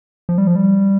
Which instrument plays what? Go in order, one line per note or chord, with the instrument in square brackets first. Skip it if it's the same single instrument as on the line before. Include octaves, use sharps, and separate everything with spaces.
[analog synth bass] F3
G3
F3
G3